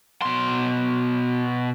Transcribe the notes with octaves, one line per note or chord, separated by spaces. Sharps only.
B2 C6